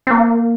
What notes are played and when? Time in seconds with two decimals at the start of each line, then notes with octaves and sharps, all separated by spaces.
0.07 C4
0.11 A#3